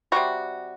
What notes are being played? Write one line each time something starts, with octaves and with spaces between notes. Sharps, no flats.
C3 D#3 G3 F#4